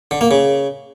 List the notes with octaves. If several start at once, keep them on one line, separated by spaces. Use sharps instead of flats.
D3
A#3
C#3